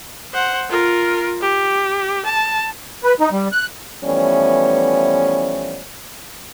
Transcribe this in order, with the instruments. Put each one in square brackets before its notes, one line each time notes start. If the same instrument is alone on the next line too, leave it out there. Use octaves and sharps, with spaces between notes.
[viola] C5 F#5
F4 A#4
G4
A5
[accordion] B4
D#4
G3
F#6
[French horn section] E3 F3 G3 A3 B3 C#4